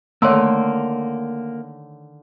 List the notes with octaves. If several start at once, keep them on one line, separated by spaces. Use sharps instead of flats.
D3 D#3 A3 A#3 C#5 C6 E6